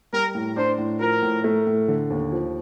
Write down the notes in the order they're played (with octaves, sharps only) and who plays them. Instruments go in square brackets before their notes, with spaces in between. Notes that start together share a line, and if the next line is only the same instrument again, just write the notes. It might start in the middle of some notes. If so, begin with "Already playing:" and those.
[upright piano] G3 [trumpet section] A#4
[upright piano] A2
[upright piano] D4 [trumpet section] C5
[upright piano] A2
[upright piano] F3 [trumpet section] A#4
[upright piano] A2
A3
A2
D3
D#2
F3